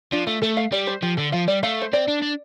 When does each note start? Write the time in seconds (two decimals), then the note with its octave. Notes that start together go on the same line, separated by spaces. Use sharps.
0.12 F3 D4
0.27 A3 F4
0.42 A3 A4
0.57 F5
0.72 G3 D5
0.87 C5
1.02 F3 G4
1.17 D3 A4
1.32 F3 F5
1.48 G3 D5
1.63 A3 F5
1.82 C5
1.93 C4 D5
2.08 D4
2.22 D4